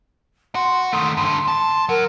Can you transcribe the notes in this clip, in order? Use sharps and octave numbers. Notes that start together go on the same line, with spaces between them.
F#4 C6
D#3 A3 C6
G2 D3 C6
A5
F#3 A#4